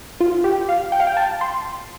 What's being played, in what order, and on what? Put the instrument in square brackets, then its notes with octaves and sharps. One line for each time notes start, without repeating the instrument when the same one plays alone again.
[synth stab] F4
G4
F5
G5
F5
G5
A5
C6